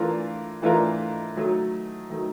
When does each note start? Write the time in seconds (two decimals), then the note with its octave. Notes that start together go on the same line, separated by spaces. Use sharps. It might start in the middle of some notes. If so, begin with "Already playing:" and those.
Already playing: E3 A3 D4 F4 A#4
0.62 E3 A3 D4 F4 A#4
1.36 D#3 F#3 A3
2.10 D#3 F#3 A3